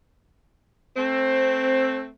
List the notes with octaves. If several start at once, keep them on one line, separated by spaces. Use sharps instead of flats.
A3 C4